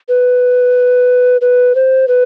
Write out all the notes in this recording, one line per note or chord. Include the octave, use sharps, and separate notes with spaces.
B4
B4
C5
B4